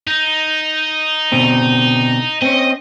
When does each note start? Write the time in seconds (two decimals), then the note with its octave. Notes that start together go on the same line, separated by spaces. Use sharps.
0.07 D#4
1.32 B2 D3 C4
2.42 C4 C#4 D#5